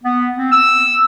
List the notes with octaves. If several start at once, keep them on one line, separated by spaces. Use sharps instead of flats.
B3
C4
E6